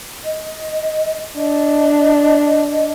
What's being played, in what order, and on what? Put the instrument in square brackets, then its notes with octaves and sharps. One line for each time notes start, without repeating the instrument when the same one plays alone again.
[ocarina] D#5
[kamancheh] D4 [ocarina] D#5